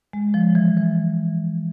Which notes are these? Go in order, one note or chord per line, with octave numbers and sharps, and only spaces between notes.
G#3
F3
E3
E3